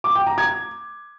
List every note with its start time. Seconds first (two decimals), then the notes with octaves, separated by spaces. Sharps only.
0.04 D6
0.15 G5
0.27 A#5
0.38 G#6